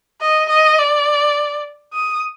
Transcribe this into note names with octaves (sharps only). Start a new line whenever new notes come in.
D#5
D#5
D5
D#6